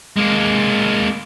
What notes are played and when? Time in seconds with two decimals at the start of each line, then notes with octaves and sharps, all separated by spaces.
0.17 G#3 A#3